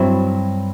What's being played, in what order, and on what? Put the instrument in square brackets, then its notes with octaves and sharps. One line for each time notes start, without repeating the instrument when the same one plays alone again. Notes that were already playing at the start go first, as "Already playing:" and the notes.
Already playing: [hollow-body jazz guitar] G2 F#3 C4 E4